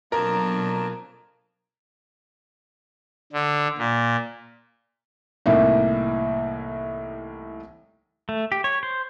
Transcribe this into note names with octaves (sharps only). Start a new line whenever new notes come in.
F2 B2 F#3 A#3 D4 A#4 A5
D3
A#2
C2 A2 E3 A#3 D#4
A3
G4
C#5
C5